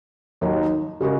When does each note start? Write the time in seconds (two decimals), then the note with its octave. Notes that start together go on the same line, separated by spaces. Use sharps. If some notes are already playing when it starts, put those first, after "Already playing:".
0.41 D#2 D#3 F#3 A#3 D#4
1.01 C#3 G#3 F#4 A#4